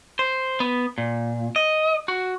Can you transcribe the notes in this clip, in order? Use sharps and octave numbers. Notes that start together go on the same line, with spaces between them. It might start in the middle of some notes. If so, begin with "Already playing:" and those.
C5
B3
A#2
D#5
F#4